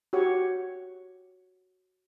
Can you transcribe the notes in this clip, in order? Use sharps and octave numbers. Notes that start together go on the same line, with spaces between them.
F#4 G4 C#5 F#5